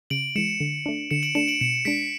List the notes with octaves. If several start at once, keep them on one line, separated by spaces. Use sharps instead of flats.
C#3 D7 F#7
E3 G#3 C#7 E7
D3
A3 D4
D3 C#7 E7
D7 F#7
A3 D4 C#7 E7
D7 F#7
B2 C#7 E7
G#3 D4 B6 D7